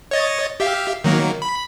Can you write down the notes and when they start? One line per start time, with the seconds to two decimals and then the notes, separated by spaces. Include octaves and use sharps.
0.11 C#5 D#5 A6
0.60 G4 E5 F5
1.04 D#3 F#3 A#3
1.42 B5